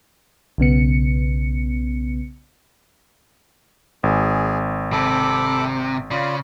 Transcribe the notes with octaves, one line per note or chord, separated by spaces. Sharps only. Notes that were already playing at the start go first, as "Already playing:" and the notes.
B1 C#3 B3 C#7
G#1 G#4
C3 A4 B5 D6
C#3 F4 D5 B5